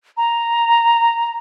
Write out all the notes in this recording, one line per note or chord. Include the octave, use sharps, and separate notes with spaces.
A#5